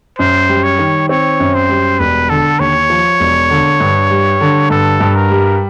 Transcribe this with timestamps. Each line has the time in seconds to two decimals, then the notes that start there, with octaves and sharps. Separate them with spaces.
0.19 F#2 C5
0.49 G3
0.64 C#5
0.78 D#3
1.09 C4 C#5
1.40 F#2
1.55 C5
1.69 G3
1.99 E1 B4
2.29 D3 A4
2.59 D#2 C#5
2.90 F3
3.20 E1
3.50 D3
3.80 G2
4.10 G3
4.41 D3
4.70 G2 A4
5.00 G2
5.16 A#4
5.31 G3